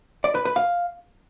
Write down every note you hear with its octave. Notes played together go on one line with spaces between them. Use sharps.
D5
B4
B4
F5